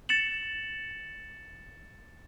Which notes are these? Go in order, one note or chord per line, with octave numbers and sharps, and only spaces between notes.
A6 C#7 E7 F#7